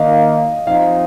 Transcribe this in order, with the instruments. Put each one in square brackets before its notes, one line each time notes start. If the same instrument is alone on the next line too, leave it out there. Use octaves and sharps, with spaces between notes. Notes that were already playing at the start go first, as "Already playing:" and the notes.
Already playing: [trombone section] D#3 A#3 D#4 [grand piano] D#5 F5
[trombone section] F3 C4 D#4 [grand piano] F5